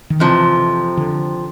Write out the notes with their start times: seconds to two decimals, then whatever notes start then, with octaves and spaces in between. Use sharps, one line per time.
0.10 D#3
0.19 F2 C3 E3 F3
0.97 D3